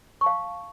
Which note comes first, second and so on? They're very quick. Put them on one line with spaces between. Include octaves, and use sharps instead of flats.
C#6 A5 F5